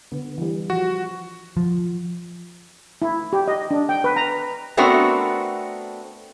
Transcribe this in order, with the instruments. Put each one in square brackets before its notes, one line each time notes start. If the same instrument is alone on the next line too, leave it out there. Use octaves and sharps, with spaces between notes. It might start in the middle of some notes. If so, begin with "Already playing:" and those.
[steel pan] D3 B3 B4
E3 G3
[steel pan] F3 [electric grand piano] F#4
[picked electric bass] F3
[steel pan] E4
G4
D#5
D4
G5
B4
A#5
[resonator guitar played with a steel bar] A3 B3 C4 D4 F#4 A#4